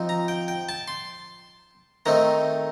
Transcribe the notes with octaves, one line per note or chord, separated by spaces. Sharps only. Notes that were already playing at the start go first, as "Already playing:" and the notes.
Already playing: F3 C4 D#4
A#5
G5
G5
A5
C6
D#3 A3 C4 D#4 A#5